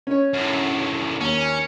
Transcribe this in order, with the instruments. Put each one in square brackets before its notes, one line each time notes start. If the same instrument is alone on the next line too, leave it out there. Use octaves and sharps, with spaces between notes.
[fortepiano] C#4 C#5
[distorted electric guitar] F#2 A2
[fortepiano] D#2 [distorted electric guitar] C#4